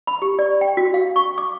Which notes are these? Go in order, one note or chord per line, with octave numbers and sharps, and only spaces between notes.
B5
G4
D5
G5
F#4
F5
C#6
D6